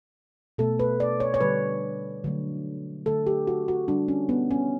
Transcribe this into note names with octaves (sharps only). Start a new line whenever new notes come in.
B2 A3 A4
B4
D5
C#5
C#5
D3 G3 B4
D3 F#3 A3
D3 A3 A4
G4
F#4
F#4
D3 G3 D4
C#4
B3
C#4